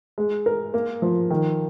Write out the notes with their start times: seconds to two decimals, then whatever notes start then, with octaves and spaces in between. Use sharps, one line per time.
0.18 G#3
0.46 A#4
0.74 A#3
1.02 F3
1.30 D#3